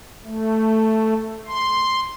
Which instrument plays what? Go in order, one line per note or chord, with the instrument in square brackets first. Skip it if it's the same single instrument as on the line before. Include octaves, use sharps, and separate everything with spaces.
[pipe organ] A3
C6